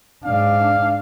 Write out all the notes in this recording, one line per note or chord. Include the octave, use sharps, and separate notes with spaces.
G#2 D4 F5